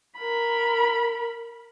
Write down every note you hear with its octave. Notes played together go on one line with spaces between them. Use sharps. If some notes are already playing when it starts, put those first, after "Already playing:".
A#4 B5